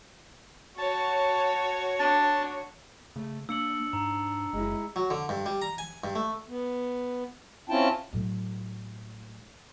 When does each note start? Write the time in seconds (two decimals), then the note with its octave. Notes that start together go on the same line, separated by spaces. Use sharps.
0.78 F#4 C#5 A5
1.99 D4 A5
3.16 C#3 A3
3.49 A#3 D4 E6 C#7 F#7
3.93 G#2 A#5
4.53 F#1 F#2 G#3 E4
4.96 F#3
5.10 D3
5.29 G2
5.46 G3
5.62 A#5
5.78 G#5
6.04 G2
6.15 A3
6.48 B3
7.69 C4 C#4 E4 F4 G5 A5
8.13 A2 F#3